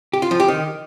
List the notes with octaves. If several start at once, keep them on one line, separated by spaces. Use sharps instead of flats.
G4
F4
F3
G4
D#3